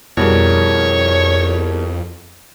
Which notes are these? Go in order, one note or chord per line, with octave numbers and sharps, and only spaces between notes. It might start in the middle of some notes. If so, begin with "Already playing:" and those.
F2 B2 G3 E4 G#4 A#4 C#5